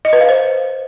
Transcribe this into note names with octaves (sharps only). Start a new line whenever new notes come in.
D#5
B4
F5
C5